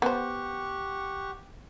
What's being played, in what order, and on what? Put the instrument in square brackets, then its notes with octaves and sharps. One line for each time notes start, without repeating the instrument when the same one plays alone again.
[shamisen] B3 C5 [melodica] G4 F#5 C#6